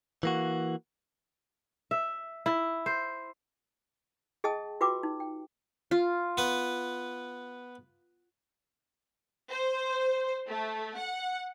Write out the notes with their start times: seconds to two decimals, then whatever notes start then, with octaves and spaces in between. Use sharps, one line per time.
0.23 E3 A#3 F#4
1.91 E5
2.46 E4
2.86 C5
4.44 G#4 D#5 G5 A5 D#6
4.81 F4 F#4 B4 G5 D6
5.03 D#4
5.20 G5
5.91 F4
6.37 B3 B4
9.51 C5
10.49 A3
10.98 F#5